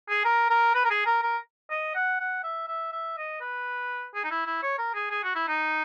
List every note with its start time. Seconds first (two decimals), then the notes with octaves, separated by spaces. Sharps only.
0.09 G#4
0.25 A#4
0.50 A#4
0.74 B4
0.85 A#4
0.90 G#4
1.06 A#4
1.23 A#4
1.70 D#5
1.95 F#5
2.20 F#5
2.44 E5
2.68 E5
2.92 E5
3.17 D#5
3.41 B4
4.15 G#4
4.24 D#4
4.31 E4
4.46 E4
4.63 C#5
4.78 A#4
4.95 G#4
5.11 G#4
5.24 F#4
5.35 E4
5.48 D#4